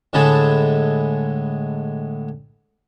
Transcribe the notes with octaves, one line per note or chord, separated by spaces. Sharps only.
A2 D3 G#3 G#4 A5 B5